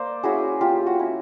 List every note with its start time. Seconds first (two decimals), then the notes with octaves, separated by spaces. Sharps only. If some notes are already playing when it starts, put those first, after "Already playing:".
Already playing: A#3 C5 D5
0.23 C#4 E4 F#4 G#4
0.61 A#3 F4 G4
0.87 F#4
0.99 C#4 E4